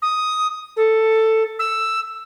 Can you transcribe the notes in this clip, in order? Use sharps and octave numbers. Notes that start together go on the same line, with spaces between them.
D#6
A4
E6